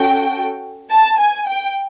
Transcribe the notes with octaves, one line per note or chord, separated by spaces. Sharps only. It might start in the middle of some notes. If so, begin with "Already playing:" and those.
Already playing: C#4 F#4 A4 G5
A5
G#5
G5